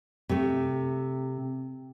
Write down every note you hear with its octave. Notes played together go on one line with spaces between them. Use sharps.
C3 A3